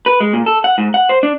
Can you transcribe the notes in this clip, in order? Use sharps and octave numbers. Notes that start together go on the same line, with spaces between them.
B4
G#3
A#2
A4
F#5
G#2
F#5
C5
D4